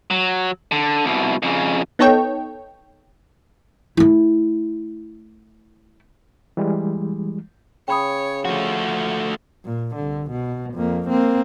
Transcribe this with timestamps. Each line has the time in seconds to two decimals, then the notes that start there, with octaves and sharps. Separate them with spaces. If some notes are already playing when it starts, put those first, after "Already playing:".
0.11 F#3
0.72 D3
1.05 C2 B2
1.42 F2 C#3
1.99 B3 D#4 A4 C#5 G5
3.97 A3 E4
6.57 E3 G3 G#3
7.88 C#3 C#5 G5 B5 D#6
8.45 F3 A3 F#4
9.65 A#2
9.96 C2 D3
10.31 B2
10.74 F2 A#3
11.09 A#3 C4